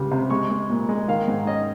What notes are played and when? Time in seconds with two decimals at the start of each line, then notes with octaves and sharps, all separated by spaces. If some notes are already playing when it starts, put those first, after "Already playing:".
Already playing: C#2 G3
0.11 C3
0.30 G#3 C#6
0.50 G#3
0.70 A#2
0.89 G#3
1.08 D#3 F5
1.28 G#2
1.47 C#4 D#5